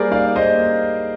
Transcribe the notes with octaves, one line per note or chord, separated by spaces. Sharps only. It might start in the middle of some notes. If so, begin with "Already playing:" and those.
Already playing: G3 A#3 G#4 A#4 C5 D5
D#4 D5 F5
A#3 C5 D#5